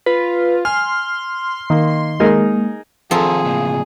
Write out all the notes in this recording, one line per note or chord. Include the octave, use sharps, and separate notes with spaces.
F4 B4
G#5 C6 F6
D#3 A#3
G#3 A#3 D#4 G#4 A#4
D#3 F3 C4 G#4 A4 A#5
A2 C#3 A#3